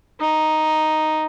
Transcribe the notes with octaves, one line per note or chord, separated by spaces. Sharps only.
D#4